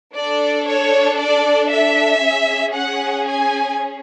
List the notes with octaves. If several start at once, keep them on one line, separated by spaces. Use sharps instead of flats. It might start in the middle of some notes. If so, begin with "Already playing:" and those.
D4 A4 D5
C#5
D5
E5
C#4 G#4
F#5
G#5